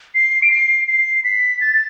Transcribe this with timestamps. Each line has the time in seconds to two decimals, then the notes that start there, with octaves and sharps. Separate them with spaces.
0.15 C7
0.42 D7
0.51 C7
0.88 C7
1.24 B6
1.61 A6